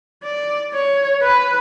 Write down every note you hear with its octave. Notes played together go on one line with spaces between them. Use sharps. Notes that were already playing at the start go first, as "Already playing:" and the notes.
D5
C#5
B4